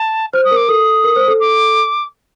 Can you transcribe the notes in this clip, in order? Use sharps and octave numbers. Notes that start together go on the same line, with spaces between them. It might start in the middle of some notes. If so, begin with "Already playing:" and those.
Already playing: A5
C5 F6
D#6
A#4
D6
A4 D#6
A#4
C5
A4
D6